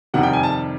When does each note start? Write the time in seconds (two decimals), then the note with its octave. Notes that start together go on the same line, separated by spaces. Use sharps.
0.14 F2 C3 D#3 G3 F#5
0.23 G5
0.33 G#5
0.43 A5